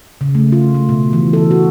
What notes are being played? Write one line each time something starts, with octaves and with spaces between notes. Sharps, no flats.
C#3
A3
F4
A3
B2
E3
A4
F#4